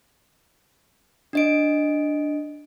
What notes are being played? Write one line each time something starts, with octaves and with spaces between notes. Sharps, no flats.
D4 D#5 D7